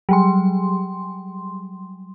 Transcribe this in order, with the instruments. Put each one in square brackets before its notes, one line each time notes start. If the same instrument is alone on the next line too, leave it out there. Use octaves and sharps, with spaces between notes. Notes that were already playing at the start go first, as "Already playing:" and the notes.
[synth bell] F#3 G3 C6